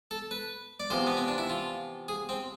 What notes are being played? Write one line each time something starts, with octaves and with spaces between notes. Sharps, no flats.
A4
B4
D5
E2 C3 F3 C5
B3
C4
D4
E4
F4
G#4
C4